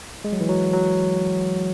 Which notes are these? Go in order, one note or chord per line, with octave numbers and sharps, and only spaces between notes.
G#3
F#3
E3
F#3
F#3